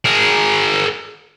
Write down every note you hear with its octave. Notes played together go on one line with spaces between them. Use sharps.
G#4 A#4